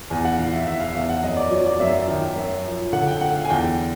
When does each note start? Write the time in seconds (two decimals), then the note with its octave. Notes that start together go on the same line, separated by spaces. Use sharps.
0.10 E2 G#5
0.25 F#5
0.38 E3 F5
0.53 E5
0.67 E2 E5
0.80 F5
0.88 E5
0.95 E2 F5
1.10 F#5
1.23 F#2 D#5
1.37 D5
1.51 F#3 C#5
1.66 D5
1.80 F#2 E5
2.08 D#3
2.36 F#2
2.65 F3
2.93 D3 F#5
3.07 G5
3.21 D3 F#5
3.36 F5
3.45 G#5
3.49 E2 G5